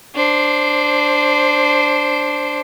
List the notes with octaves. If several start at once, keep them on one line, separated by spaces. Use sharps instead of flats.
D4 C5